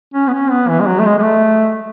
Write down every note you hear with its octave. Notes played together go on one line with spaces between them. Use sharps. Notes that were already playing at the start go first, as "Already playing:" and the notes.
C#4
B3
C#4
B3
E3
G#3
F#3
A3
G#3
G#3
A3